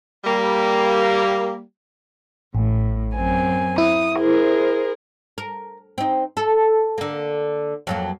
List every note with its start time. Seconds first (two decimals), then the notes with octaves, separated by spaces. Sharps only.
0.25 G3 A#3
2.55 A1 A2
3.15 F#2 C4 G#5
3.78 E4 D#6
4.17 G#4 A#4 C5
5.38 A#4
5.98 C4 D#4
6.37 A4
6.98 D3 A#3
7.87 F2 F#3 A#3